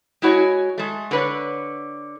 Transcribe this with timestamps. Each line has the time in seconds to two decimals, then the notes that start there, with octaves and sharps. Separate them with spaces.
0.22 G#3 E4 F#4 C#5 D#5
0.78 G#3 A3
1.11 D3 B4 C#5